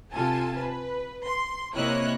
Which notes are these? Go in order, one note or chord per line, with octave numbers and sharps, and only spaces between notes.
C3 F4 A4 G#5 A5
B4
C6
C3 A#3 E4 C#5 D#5 F#6